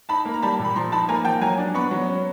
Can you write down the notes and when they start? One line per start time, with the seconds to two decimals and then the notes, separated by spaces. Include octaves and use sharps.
0.09 D#4 A5 B5
0.25 A#3
0.34 A#5
0.42 G3 A5 B5
0.59 A#2
0.65 B5
0.75 F3 A#5 C6
0.92 D#4 A5 B5
1.09 A#3 G#5 A#5
1.25 F3 G5 A5
1.41 F#3 G#5 A#5
1.58 D4
1.74 B3 B5 C#6
1.91 F#3
2.08 C#4